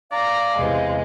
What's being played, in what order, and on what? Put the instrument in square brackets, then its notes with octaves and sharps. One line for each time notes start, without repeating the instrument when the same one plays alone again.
[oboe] D5 [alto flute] F5 [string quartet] A#5
[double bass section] E2 C3 [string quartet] G#3